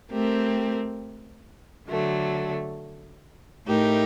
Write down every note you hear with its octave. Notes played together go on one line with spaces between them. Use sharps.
A3 C4 G4 A#4
D3 F#3 A3
A2 A3 D#4 G4 A#4